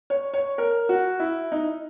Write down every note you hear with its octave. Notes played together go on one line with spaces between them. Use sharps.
C#5
C#5
A#4
F#4
E4
D#4